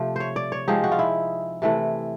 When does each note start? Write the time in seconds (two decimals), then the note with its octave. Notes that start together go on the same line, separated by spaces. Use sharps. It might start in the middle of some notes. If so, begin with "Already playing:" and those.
Already playing: C3 F3 A3
0.16 C5 C#5
0.36 D5
0.52 C#5
0.68 F3 G#3 C4 D#4 G4
0.84 F#4
0.92 F4
0.99 E4
1.62 C3 E3 A3